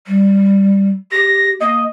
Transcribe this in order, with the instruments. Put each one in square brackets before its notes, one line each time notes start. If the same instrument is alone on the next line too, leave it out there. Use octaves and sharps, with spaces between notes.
[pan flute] G3
[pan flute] G4 [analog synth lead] A#6
[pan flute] A#3 [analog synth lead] D#5